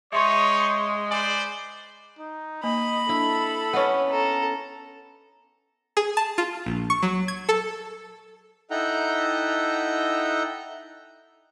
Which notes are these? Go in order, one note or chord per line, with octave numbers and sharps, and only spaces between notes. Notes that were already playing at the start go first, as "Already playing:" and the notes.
G#3 D#4 G#4 C#5 E5 C6 C#6
B4 C5 D5 G#5
D#4
A#3 D#5 B5
D4 E4 A4
B3 C#4 C#5 D#5 F#5
A4 A#5
G#4
A5
F4
A#1
C#6
F#3
G#6
A4
D#4 E4 A4 F#5 G5 A#5